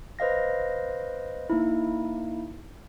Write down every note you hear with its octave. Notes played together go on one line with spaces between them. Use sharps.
B4 C5 D#5 F5 A#6
A#3 D#4 E4